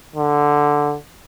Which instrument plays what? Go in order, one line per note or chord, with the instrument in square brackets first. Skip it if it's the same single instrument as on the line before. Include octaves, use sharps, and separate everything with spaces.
[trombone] D3